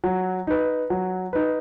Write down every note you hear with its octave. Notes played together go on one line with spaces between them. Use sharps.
F#3
D#4 B4
F#3
D#4 B4